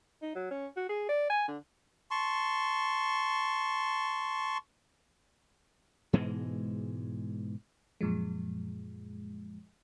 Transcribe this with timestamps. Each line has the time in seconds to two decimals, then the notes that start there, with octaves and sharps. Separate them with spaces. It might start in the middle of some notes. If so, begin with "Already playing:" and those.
0.22 D#4
0.35 F#3
0.50 C#4
0.77 F#4
0.89 G#4
1.09 D5
1.30 G#5
1.48 D3
2.11 A5 C6 C#6
6.13 G#2 B2 E3 G#3
8.01 F#2 A#2 F3 G#3